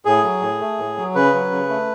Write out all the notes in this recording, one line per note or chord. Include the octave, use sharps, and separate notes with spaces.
A2 G#4
F#3
A2
A3
A2
F#3
C#3 B4
F#3
C#3
A3